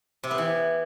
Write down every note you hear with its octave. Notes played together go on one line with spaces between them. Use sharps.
C3
B3
E3